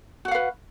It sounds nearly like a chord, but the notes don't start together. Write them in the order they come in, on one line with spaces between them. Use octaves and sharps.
F#4 F#5 F5 B4